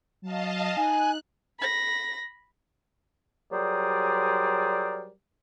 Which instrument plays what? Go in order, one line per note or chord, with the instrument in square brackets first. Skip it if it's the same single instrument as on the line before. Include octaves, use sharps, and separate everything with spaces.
[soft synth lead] F#3 [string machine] D#5 F5 A5
[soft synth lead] D#4 [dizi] G#5 [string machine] F#6
[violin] B5 A#6
[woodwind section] F#3 G3 G#4 A#4 C5 D5